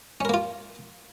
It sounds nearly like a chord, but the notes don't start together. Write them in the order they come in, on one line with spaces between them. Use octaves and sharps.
C#4 A#4 A#3 F4